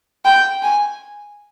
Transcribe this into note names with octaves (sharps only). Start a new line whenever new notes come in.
G5
G#5